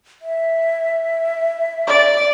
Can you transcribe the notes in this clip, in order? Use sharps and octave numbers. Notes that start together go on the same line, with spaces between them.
E5
D5